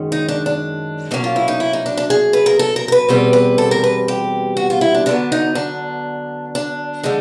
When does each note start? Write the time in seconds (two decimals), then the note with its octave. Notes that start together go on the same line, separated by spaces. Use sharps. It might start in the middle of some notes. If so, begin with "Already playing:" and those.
Already playing: F#2 D#3 G#3 C#4
0.12 D#4
0.28 D4
0.46 D4
1.11 B2 F#3 A#3 C#4 D#4
1.24 F4
1.36 E4
1.48 D#4
1.60 E4
1.73 D#4
1.86 D4
1.97 D4
2.10 G#4
2.33 B4
2.46 A#4
2.59 A4
2.76 A#4
2.88 A#4
2.92 B4
3.09 E2 B2 G3 C4 B4
3.33 B4
3.58 A4
3.71 A#4
3.84 B4
4.08 G4
4.57 F#4
4.70 F4
4.81 E4
4.94 D4
5.06 D3 F#3 B3 D4
5.32 D#4
5.55 D4
6.55 D4
7.03 D3 F3 G#3 D#4